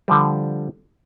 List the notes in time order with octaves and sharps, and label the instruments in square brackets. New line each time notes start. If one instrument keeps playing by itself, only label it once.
[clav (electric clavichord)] D3 F3 G3